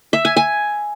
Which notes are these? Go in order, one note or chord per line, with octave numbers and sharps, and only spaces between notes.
E5
G#5
G#5